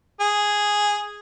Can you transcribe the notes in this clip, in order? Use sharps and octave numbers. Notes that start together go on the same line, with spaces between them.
G#4